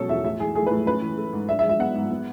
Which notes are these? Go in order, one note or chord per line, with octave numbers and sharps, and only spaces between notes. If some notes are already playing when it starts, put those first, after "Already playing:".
Already playing: B2 F#3 C#4 A4 C#5
E2 E5
A2 E5
E3 G#4
A3 G#4
A2 B4
C#4 B4
E3
A3
G#2
D4 E5
E5
G#3
E5
B3 F#5
G#2
B3